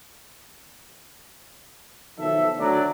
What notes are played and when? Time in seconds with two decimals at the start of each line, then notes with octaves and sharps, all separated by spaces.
2.19 B1 D#3 F3 A4 E5
2.59 D2 F#3 D5